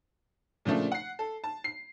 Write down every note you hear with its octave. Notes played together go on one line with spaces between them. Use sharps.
A#2 C#3 F3 A3 D4
F#5 C7
A4
A5
C7